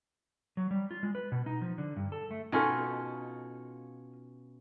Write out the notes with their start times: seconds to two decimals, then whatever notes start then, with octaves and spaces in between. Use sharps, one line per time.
0.57 F#3
0.71 G3
0.91 F4
1.03 G#3
1.15 B4
1.32 B2
1.46 D#4
1.62 F3
1.78 D3
1.96 G2
2.12 A4
2.31 A3
2.52 B2 C#4 D#4 F4 A4